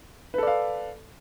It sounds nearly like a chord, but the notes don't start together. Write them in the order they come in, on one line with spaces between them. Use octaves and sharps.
B4 A4 D5 F5